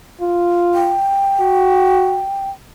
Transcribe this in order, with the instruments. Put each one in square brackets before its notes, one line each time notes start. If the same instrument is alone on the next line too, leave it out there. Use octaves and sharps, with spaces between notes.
[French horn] F4
[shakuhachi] G5
[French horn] F#4